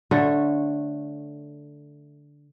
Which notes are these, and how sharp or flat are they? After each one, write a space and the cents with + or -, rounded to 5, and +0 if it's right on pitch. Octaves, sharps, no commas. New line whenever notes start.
D3 -5 A3 +0 C#5 -20